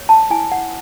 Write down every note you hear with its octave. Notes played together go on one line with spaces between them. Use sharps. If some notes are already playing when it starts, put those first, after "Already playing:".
Already playing: C#5
A5
E4 G#5
F#5